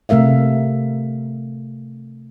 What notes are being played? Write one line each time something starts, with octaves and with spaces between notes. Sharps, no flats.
C3 A3 A#4 E5 F5